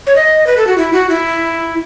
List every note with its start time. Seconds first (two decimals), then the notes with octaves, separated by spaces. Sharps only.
0.07 C#5
0.16 D#5
0.47 B4
0.57 A4
0.67 F#4
0.78 E4
0.93 F#4
1.10 E4